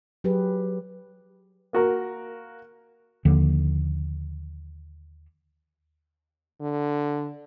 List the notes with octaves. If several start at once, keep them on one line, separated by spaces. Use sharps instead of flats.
F#3 G4 G#4 B4
A#3 F#4 A#4
D#2 D3 F3
D3